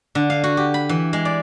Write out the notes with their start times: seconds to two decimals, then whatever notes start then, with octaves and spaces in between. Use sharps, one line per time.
0.15 D3
0.30 F5
0.44 F#4
0.57 G4
0.74 B5
0.89 E3
1.13 G#3
1.25 D5